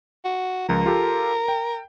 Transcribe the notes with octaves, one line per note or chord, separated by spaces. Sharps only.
F#4
C#2 F3 A#4
F4 G4 A4
G5